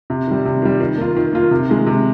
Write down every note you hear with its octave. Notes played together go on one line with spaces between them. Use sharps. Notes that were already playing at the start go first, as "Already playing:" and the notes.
C3
D#3 G3
C3
D#3 G3
D#3
A#3 F4
D#3
A#3 F4
C3
D#3 G#3
C3